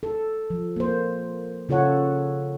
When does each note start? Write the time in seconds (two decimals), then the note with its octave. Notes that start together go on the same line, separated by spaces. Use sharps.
0.03 A4
0.50 F3
0.76 A#3 C5
1.69 C#3 F4 A4 C#5 F#5